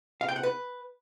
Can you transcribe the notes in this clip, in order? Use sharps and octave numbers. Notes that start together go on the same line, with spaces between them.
F5
G5
F#5
B4